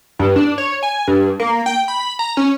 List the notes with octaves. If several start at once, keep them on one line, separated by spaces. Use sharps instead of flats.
G2
D4
C#5
G#5
G2
A#3
G5
B5
A#5
C#4